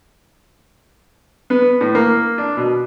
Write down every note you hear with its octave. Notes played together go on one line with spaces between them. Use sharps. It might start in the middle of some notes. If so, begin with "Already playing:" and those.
B3
A2
A#3
D4
B2